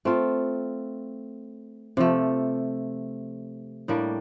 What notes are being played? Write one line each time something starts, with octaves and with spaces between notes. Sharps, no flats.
A3 C4 F4
C3 F3 A3
A2 G3 A#3 D4